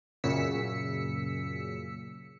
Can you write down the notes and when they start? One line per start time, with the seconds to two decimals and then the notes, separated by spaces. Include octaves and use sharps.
0.24 F#2 A#2 C#3 E6 B6 C#7